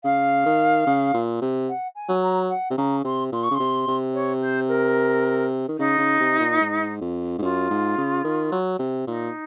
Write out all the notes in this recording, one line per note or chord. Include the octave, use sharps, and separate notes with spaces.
C#3 F5
D#3
C#3
A#2
C3
F#5
G#5
F#3
A#5
F#5
C3
C#3 A#5
C3 C6
A#2 C6
C#6
C#3
C3 C6
C3
C#5
C5
A#4
D#3
C#3 D#4
C#3
C3
A#2
G#2
F2
G#2
F#2 F4
G#2
C#3
D#3
F#3
C3
A#2 D#4